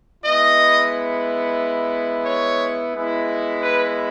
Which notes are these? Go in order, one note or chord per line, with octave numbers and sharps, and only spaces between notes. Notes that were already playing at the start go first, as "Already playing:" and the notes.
G#3 B3 E4 D#5
C#5
G#3 B3 E4
B4